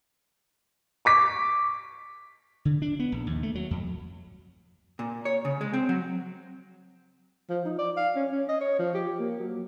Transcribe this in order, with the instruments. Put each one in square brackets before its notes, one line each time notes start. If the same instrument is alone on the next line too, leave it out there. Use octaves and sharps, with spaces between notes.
[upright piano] C#6 D6 B6
[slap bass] D3
D4
B3
A#1
D#2
A3
F#3
F2
[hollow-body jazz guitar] A#2
C#5
C#3
G#3
C4
F#3
[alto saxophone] F3
D#4
D5
F5
C#4
C#4
D#5
C#5
F3
G4
A#3
F#3